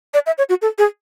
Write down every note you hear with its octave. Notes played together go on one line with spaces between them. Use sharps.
D5
E5
C#5
F#4
A4
G#4